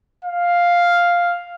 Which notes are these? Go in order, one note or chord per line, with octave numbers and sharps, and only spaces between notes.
F5